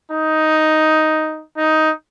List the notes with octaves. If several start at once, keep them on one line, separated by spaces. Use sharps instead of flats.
D#4
D#4